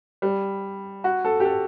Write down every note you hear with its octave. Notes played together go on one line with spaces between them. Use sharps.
G3
F#4
A4
G4
A4